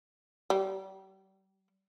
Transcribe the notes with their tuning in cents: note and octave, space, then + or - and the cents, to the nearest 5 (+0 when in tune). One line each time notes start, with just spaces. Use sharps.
G3 -35